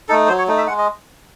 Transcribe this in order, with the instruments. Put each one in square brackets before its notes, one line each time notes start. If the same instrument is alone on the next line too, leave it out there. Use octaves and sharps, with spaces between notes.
[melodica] A3 D#4 A4
F#3 C5
C#5
A3 D#4
E5
G#3 F#5
D#5